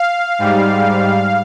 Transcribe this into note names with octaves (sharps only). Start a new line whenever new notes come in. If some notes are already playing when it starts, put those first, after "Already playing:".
Already playing: F5
G#2 G3